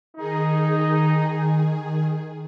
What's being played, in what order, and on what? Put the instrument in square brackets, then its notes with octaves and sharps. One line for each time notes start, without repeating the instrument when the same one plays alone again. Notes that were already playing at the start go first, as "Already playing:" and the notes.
[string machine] D#3 G#4 [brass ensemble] D#4